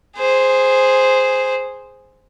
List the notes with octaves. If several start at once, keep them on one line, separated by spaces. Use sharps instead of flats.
G#4 C5